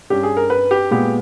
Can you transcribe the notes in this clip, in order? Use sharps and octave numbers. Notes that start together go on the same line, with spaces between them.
G2 G3 C#4 G4
G#4
A#4
B4
G4
A#2 G#3 B3 G4